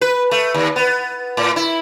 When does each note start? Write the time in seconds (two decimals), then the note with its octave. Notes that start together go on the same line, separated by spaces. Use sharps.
0.01 B4
0.31 A3
0.54 D#2
0.76 B3
1.37 A2
1.56 E4